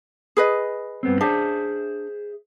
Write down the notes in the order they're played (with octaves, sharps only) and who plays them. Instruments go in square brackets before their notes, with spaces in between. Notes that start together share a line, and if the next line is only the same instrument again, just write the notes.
[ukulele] G#4 B4 D#5
[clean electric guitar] G2 B3 C4
[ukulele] D4 [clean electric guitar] G#4 C5 E5